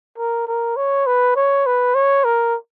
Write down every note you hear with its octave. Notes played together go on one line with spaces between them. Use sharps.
A#4
A#4
C#5
B4
C#5
B4
C#5
A#4